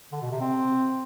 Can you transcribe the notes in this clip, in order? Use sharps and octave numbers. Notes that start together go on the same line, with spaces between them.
D3
B2
C3
C4